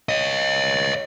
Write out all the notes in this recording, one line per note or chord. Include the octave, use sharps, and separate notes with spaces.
C#5 D#5